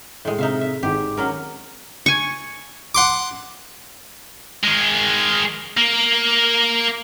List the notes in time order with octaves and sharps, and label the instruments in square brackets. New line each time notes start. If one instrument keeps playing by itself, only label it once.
[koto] A2 G#3
[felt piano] C3 [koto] D#4 E5 F5
[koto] E5
[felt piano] G#1 D#4 G#4 [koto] G4
[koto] F#3 C#4 A#4
[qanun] G#5 C#6
[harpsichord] F#5 C6 D6
[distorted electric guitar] D#3 G#3
A#3